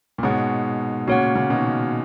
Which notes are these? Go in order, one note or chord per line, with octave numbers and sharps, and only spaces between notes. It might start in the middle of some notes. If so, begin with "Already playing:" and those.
A#2
G#2 B2 G#4 C#5 F#5
A#2 C#3 F#4 C#5 F#5
A#2 C#3
B2 D#3